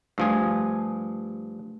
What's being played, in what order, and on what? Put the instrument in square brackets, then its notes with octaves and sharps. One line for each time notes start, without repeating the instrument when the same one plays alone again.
[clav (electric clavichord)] G2 F3 G#4 [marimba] A3